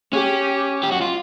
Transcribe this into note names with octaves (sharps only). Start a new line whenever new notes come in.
C#4 G4
G4
F#4
F4